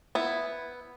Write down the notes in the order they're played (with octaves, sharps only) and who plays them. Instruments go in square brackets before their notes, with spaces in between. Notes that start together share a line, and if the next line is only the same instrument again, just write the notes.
[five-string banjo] B3 E4